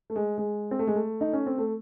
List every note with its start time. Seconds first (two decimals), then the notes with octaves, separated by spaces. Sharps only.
0.10 A3
0.16 G#3
0.38 G#3
0.71 C4
0.79 A3
0.87 G#3
0.96 A3
1.21 D#4
1.33 C#4
1.46 C4
1.58 A3